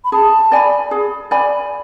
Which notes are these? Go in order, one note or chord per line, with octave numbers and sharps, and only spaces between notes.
B5
G#4 A5
D5 G#5 B5
G#4
D5 G#5 B5